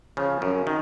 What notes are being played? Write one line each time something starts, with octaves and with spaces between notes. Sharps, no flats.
C#3 F3
F#2
D#3